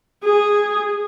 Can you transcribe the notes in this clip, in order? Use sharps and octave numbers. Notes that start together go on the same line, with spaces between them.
G#4